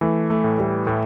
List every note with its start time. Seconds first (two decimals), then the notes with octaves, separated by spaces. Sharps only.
0.01 E3 A3
0.30 A3
0.44 A2
0.58 G3
0.86 A2 A3